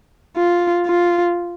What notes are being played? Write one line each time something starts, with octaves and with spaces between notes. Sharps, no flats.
F4
F4